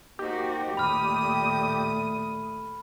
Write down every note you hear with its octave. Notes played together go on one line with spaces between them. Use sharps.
A#3 D#4 F#4 G4 C5
D#2 A#2 A3 B5 D#6 F6